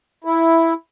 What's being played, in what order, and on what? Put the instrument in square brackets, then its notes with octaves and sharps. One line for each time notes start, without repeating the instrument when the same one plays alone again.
[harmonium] E4